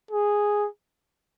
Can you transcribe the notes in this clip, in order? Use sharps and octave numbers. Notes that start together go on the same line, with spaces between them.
G#4